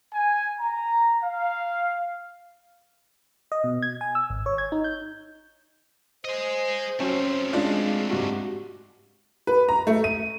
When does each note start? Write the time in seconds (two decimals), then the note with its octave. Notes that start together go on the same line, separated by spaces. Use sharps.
0.13 G#5
0.59 A#5
1.23 F5
3.52 D#5
3.64 B2
3.82 G#6
4.01 G#5
4.15 E6
4.30 G#1
4.46 C#5
4.58 G#6
4.72 D#4
4.84 G6
6.25 G#4 C5 D#5
7.00 F#3 A3 C4 C#4
7.53 G#3 D4 F4
8.10 G#2 F#4 G4
9.47 B4
9.69 A#5
9.87 A3
10.04 D#7